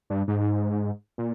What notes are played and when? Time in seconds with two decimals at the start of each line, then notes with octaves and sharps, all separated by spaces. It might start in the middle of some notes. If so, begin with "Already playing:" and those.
0.10 G2
0.28 G#2
1.18 A#2